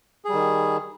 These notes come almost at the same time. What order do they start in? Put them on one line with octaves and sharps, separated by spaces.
G#4 G3 D#3